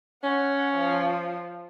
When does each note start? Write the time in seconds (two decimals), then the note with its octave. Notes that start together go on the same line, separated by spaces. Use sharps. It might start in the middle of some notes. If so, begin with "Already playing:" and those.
0.24 C#4 F#5
0.75 F3